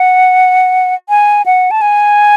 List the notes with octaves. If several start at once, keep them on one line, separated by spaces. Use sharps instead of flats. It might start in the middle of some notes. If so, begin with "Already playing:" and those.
Already playing: F#5
G#5
F#5
A5
G#5